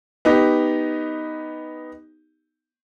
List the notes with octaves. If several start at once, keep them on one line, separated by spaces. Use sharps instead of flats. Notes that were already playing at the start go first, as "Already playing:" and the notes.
B3 D#4 G4